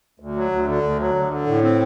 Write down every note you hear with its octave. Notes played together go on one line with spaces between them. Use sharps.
D2
F#3
D2
D3
D2
F#3
D2
D3
A2
C4